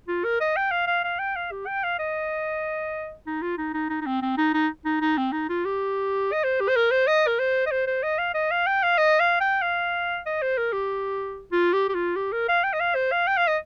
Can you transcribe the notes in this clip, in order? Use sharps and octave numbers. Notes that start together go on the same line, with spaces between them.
F4
A#4
D#5
G5
F5
F5
F5
G5
F5
G4
G5
F5
D#5
D#4
F4
D#4
D#4
D#4
D#4
C4
C4
D#4
D#4
D#4
D#4
C4
D#4
F4
G4
D#5
C5
G4
C5
A#4
C5
D#5
A#4
C5
D#5
C5
C5
D#5
F5
D#5
F5
G5
F5
D#5
F5
G5
F5
D#5
C5
A#4
G4
F4
G4
G4
F4
G4
A#4
F5
G5
D#5
F5
C5
F5
G5
F5
D#5